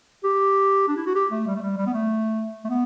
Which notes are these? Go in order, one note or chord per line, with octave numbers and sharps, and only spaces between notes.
G4
D4
E4
F#4
G4
A3
G3
A3
G3
G3
B3
A3
A3
B3